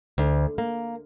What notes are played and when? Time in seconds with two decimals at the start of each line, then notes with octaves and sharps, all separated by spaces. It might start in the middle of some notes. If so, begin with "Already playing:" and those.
0.18 D2
0.58 A#3